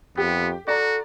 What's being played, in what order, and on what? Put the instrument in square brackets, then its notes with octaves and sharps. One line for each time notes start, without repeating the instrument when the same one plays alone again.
[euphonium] F2 [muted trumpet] B3 [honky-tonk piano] G4
[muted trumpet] F#4 [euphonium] A4 [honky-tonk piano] D5 A#5